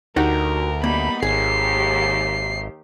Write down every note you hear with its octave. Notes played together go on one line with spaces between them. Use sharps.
D2 D#4 F#4 G4 A#4
G3 A#3 B3 D#4 B5
G#1 D#2 D#3 G4 G#4 C7